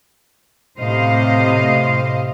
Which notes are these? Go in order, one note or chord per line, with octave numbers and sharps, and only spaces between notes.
A2 C3 C5 D#5 F5